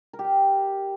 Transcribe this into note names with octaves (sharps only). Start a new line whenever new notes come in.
A#4
G4
G5